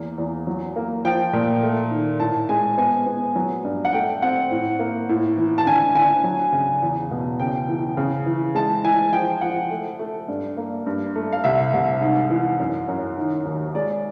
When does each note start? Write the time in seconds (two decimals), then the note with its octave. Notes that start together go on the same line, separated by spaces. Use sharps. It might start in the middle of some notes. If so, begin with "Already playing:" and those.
Already playing: E2 A#3
0.18 E2
0.47 F#3
0.76 A#3
1.05 F3 G5
1.33 A#2
1.63 A3
1.91 D#3
2.20 A2 A5
2.49 G#3 G#5
2.78 B3 G#5
3.06 B3
3.36 F#3
3.64 G2
3.85 F#5
3.93 A3 G5
4.22 C4 F#5
4.51 A2
4.79 A#3
5.09 A2
5.37 E3
5.58 A5
5.66 D3 G#5
5.95 D3 G#5
6.24 F#3
6.53 C#3
6.82 E2
7.11 B2
7.40 C#3 G5
7.68 E3
7.97 C#3
8.26 E3
8.55 G#3 A5
8.84 E3 G#5
9.12 F3 G5
9.41 F3 F#5
9.71 A3
9.99 A3
10.28 G2
10.57 A#3
10.86 G2
11.16 A3
11.32 F5
11.44 C2 E5
11.73 C2
12.01 G#2
12.30 E3
12.59 F#2
12.88 F#2
13.18 D#3
13.45 D#2
13.75 G#3 D5